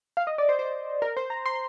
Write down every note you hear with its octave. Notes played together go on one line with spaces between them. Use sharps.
F5
D#5
D5
C5
C5
A#4
C5
A#5
C6